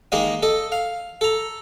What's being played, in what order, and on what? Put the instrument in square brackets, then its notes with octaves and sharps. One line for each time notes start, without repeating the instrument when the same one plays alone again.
[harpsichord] D#3 G#3 A#3 D#5
A4 D#5
F5
A4 A#5